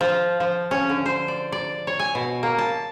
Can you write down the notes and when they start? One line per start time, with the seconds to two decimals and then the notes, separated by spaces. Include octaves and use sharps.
0.01 F3
0.40 F3
0.71 C#4
0.89 D3
1.06 C5
1.28 D5
1.52 D5
1.87 C#5
1.99 G#5
2.15 B2
2.43 A#3
2.58 A5